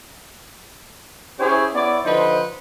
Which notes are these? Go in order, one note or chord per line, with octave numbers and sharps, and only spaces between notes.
C#4 E4 G4 G#4 C5 C#5
B3 E4 C#5 D5
D3 F3 D#4 B4 C5